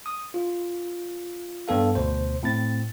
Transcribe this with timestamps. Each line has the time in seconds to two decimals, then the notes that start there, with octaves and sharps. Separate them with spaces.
0.06 D#6
0.34 F4
1.68 G2 B3 A4 F5
1.95 D2 B2 C5
2.43 A2 C4 A6